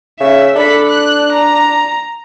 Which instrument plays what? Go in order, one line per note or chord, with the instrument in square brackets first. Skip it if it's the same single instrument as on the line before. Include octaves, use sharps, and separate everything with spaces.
[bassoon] C#3 [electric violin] E5
[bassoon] D4 [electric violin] A4 B5
[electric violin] F#6
A#5